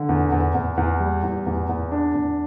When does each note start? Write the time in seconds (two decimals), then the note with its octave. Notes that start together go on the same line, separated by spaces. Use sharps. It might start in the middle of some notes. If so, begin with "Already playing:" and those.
Already playing: D3
0.09 E2
0.32 E2
0.54 E2
0.77 E2
1.00 G3
1.23 E2
1.46 E2
1.69 E2
1.92 D4
2.14 E2